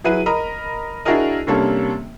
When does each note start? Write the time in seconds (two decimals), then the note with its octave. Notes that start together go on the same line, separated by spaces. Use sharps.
0.04 F#3 E4 G#4 B4 D#7
0.26 A#4 D#5 A#5 B5
1.05 D4 E4 F#4 G#4 A#4 D#5
1.47 C3 G3 A#3 C#4 D4 A4